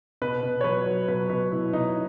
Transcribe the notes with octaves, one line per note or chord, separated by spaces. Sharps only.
B2 B4
B2
C#5
F#3 B4
F#3
B2 B4
B2 B4
B2 E4
B2 D#4